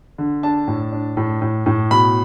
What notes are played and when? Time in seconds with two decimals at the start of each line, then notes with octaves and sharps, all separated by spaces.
0.18 D3
0.43 D4 A5
0.68 A2
0.92 D4
1.17 A2
1.42 A2
1.66 A2
1.91 B2 B5